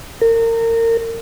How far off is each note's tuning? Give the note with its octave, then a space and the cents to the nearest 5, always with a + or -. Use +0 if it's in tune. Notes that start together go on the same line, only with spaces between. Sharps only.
A#4 -30